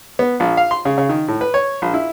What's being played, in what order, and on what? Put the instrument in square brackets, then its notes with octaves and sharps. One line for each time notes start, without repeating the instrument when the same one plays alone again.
[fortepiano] B3
A#1
F5
C6
C#3
C#3
D#3
A2
B4
C#5
A#1
E4